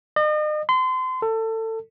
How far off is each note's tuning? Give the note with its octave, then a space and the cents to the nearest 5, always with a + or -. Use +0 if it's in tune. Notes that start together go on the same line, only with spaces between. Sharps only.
D#5 -40
C6 -30
A4 +25